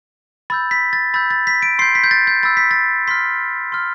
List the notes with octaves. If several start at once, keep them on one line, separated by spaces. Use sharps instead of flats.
B5 E6 G6 A6
B6
A6
B5 E6 G6 A6
A6
B6
D7
C6 G6 C7
B6
G6
A6
G6
B5 E6 G6 A6
B6
A6
C6 F6 B6
C6 F6